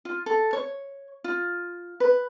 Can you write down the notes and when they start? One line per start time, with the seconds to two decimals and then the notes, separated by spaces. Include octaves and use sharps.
0.05 F4
0.26 A4
0.53 C#5
1.24 F4
2.00 B4